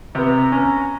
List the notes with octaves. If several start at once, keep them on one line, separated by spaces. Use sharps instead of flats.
C3 B3 A#5
C#4